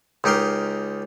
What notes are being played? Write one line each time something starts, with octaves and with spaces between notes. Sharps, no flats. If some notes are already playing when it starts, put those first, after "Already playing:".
C#2 D#4 G4 A#4 C6